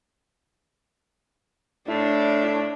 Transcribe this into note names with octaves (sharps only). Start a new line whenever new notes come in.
A2 D4 E4